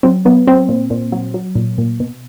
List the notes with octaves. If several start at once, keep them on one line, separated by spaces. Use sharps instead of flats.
F#3 C4
F#3 B3
F#3 C4
A#2
A#2
F#3
F#3
A#2
A#2
B2